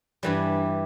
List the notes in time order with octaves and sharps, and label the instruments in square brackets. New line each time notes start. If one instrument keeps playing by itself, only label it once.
[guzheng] G2 E3 G3